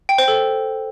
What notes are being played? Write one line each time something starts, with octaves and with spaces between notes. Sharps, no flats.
G5
C5
A4